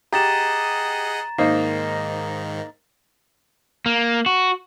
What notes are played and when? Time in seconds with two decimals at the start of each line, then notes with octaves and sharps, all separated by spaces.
0.13 G4 G#4 D#5 F#5 A#5 A6 E7
1.38 G#2 D#3 A#3 D#4 C5
3.86 A#3
4.26 F#4